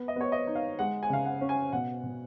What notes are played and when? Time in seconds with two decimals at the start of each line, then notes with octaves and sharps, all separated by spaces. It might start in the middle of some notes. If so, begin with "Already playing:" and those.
Already playing: B3
0.08 D#5
0.16 B3 C#5
0.32 D#5
0.47 D#4
0.55 F5
0.79 G#3 F#5
1.03 G#5
1.10 C#3 F5
1.25 F#5
1.41 C#4
1.49 G#5
1.72 B2 F#5
2.03 B2